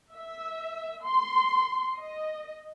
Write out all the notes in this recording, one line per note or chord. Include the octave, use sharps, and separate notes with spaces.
E5
C6
D#5